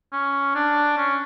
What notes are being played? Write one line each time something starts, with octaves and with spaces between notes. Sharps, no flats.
C#4
D4
C#4